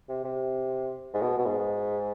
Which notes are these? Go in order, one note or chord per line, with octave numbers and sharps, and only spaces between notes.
C3
C3
G#2
B2
B2
G#2